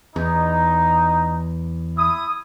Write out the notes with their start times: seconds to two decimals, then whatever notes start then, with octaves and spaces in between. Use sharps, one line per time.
0.16 E2 D#4
1.97 E4 D#6